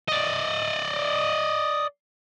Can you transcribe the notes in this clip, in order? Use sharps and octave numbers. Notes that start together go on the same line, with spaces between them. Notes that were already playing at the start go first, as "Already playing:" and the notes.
D5 D#5